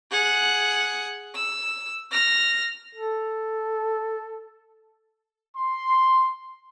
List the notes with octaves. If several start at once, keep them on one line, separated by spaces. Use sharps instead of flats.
G#4 F#5
E6
F6 A#6
A4
C6